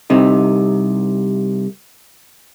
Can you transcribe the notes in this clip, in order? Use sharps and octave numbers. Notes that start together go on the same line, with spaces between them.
C2 C3 D#4